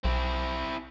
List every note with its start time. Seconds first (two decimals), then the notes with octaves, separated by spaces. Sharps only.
0.04 B1 C4 E4